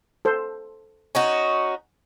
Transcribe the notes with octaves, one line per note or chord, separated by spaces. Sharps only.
A4 C5
C#4 D#4 F#4 G#5